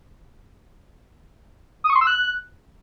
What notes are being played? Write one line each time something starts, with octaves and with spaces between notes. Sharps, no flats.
D#6
C#6
C6
E6
F#6